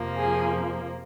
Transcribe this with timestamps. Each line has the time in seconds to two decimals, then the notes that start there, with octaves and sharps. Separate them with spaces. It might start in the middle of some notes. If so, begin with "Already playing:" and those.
Already playing: F2 C3 F3 A#3
0.18 G#4